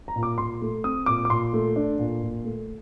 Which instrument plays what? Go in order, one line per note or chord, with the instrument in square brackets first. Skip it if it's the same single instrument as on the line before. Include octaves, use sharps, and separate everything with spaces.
[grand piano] A#5
A#2
D6
A#2 C6
A3
C4 D#6
A#2 D6
D6
A#2 C6
A3
D4
A#2
A#2
A3